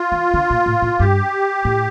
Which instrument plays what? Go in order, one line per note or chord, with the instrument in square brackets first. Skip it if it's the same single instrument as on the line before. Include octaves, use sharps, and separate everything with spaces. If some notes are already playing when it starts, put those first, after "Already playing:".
Already playing: [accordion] F4
[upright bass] E3
D3
A#2
A2
A2
[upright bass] G2 [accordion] G4
[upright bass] A2